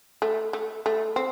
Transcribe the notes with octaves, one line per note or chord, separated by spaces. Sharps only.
A3
A3
A3
C4